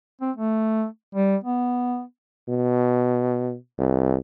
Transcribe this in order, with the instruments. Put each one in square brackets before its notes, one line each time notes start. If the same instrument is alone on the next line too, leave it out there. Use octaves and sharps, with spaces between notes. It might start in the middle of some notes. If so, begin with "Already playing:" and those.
[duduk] C4
A3
G3
B3
[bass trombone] B2
C2